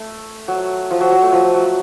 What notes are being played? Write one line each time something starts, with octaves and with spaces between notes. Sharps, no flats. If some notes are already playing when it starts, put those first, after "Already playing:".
Already playing: A3
F#3
F3
F#3
F#3
A3
F3
F#3